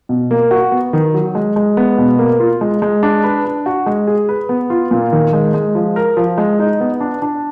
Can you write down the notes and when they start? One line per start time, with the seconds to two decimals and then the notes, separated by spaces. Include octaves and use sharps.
0.09 B2
0.31 A#3
0.51 F#4
0.72 B3
0.93 D#3
1.14 F#3
1.35 G#3
1.56 G#3
1.77 B3
1.98 B2
2.18 A#3
2.40 F4
2.61 G#3
2.82 G#3
3.03 D4
3.23 B4
3.45 D4
3.66 F#4
3.86 G#3
4.07 G#4
4.29 B4
4.49 B3
4.70 F4
4.91 A#2
5.12 D#3
5.33 G#3
5.54 G#3
5.75 F3
5.96 A#4
6.17 F3
6.38 G#3
6.59 D#4
6.80 B3
7.01 D4
7.22 D4